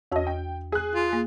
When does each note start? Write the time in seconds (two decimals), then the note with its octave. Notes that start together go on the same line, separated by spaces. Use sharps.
0.12 E2 C#4 F#4 D#5 A5
0.27 G5
0.72 G#4 F#6
0.95 F4
1.13 A#3